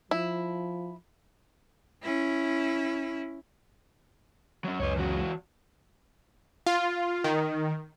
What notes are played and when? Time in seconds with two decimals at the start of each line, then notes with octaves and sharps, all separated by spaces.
0.11 F3 E4
2.02 C#4 E4
4.64 F#3 C#4
4.80 C#2 F#2 C#4 B4 C#5
4.97 E3 F#4
6.66 F4
7.24 D#3